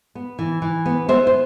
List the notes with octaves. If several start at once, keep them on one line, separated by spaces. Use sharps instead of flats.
B3
E3
E3
B3
B3 C5 E5
C5